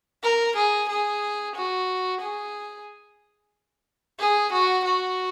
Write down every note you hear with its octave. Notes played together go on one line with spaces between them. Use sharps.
A#4
G#4
G#4
F#4
G#4
G#4
F#4
F#4